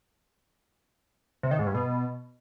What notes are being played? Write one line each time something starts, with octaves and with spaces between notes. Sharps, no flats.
C3
D#3
G#2
G2
B2